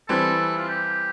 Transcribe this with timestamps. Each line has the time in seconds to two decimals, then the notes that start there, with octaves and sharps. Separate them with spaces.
0.09 E3 G3 C4 A4
0.58 F4
0.69 G4